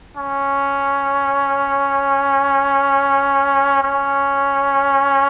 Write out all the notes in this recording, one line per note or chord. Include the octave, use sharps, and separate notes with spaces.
C#4
C#4